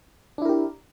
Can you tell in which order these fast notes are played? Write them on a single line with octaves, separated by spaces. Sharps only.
D4 E4 A#4 G4